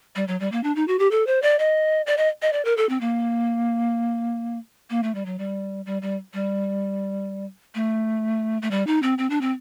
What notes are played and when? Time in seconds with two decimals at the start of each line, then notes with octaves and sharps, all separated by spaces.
0.16 G3
0.28 F#3
0.40 G3
0.52 A#3
0.63 D4
0.76 D#4
0.88 F#4
0.99 G4
1.11 A4
1.27 C5
1.42 D5
1.59 D#5
2.07 D5
2.17 D#5
2.42 D#5
2.53 D5
2.65 A#4
2.77 A4
2.89 C4
3.01 A#3
4.90 A#3
5.03 A3
5.15 G3
5.26 F#3
5.39 G3
5.86 G3
6.02 G3
6.34 G3
7.75 A3
8.62 A3
8.71 G3
8.87 D#4
9.02 C4
9.18 C4
9.30 D4
9.41 C4